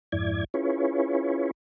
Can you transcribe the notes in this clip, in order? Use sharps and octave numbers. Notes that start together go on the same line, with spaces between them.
F2 G#2 E4 D5 G#6
C#4 E4 F4 G#4 B4 C#5